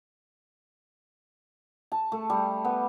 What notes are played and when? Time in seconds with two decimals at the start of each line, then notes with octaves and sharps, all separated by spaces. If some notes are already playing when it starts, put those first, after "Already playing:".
1.92 A5
2.12 A3
2.30 G3
2.65 B3